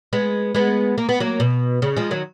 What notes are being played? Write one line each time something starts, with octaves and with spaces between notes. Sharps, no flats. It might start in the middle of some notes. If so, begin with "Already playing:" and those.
G#3 B3
G#3 B3
A#3
B3
F#3 A#3
B2
C#3
F3 G#3
D#3 F#3